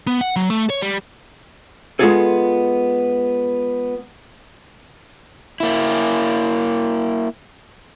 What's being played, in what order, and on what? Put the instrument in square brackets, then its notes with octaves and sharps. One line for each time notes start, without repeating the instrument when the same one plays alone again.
[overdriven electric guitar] B3
F#5
F#3
A3
C#5
G3
[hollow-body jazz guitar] G#3 B3 C4 F4 G#4 A4
[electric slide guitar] A#3 E4